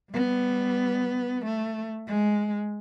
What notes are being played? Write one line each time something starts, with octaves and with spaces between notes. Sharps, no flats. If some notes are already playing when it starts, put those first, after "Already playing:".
G3 B3
A3
G#3